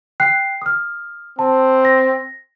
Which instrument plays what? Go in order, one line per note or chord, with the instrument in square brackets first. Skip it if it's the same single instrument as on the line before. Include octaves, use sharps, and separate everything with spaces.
[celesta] G5 F#6 C7
D#6 F6
[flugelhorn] C4 [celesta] A5
[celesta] A#6